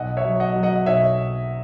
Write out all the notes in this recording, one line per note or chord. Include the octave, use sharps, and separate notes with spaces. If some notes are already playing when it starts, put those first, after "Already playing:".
Already playing: B1 D#5 F#5
C#5 E5
F#3
D#5 F#5
F#3
D#5 F#5
B1 C#5 E5